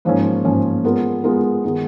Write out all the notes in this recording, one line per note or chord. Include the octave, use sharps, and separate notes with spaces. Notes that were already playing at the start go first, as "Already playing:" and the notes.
G#2 F3 A#3 C#4
G#2 F3 A#3 C#4
G#3 B3 F4 A#4
G#3 B3 F4 A#4
D#3 G#3 B3 D#4